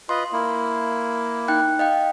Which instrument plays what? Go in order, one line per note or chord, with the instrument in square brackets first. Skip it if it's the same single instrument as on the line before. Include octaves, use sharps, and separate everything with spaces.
[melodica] F4 B4 D#5 [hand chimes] C6
[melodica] A#3 E4
[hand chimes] D#4 G5 F#6
D#5 F5 G5